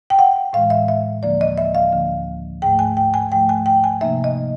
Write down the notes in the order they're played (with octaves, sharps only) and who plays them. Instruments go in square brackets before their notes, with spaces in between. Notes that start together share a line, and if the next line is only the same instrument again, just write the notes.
[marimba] G5
F#5
A2 E3 G#3 F5
E5
E5
D2 D3 F3 A#3 D5
D#5
E5
F5
D2 D3 F3 A#3
G#2 F3 A3 G5
G#5
G5
G#5
G#2 F3 A3 G5
G#5
G5
G#5
C3 F3 A#3 D#4 E5
D#5